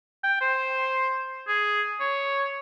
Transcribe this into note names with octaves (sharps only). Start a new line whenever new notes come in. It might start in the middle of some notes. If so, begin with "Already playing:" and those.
G5
C5
G#4
C#5